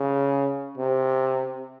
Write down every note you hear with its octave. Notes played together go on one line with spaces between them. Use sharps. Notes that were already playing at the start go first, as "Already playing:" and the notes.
Already playing: C#3
C3